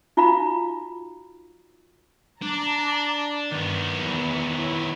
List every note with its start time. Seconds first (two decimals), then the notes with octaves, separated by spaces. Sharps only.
0.17 D#4 F4 F#4 F5 A#5 B5
2.42 D4 A5 A#5 D6
3.52 G2 D#3 B3
4.00 E2 E3
4.52 E4 C#5